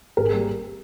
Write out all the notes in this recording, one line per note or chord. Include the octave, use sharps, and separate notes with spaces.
G#1 A#4
G#4
G3 A#3 G4